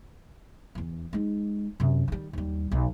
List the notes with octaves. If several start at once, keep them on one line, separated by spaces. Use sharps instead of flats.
E2 E3
G#3 D#4
F#2 C3
D#3 G3
D#2 G3
B1